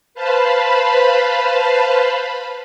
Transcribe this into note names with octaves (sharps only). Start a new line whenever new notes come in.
B4 C5 F5 A5 B5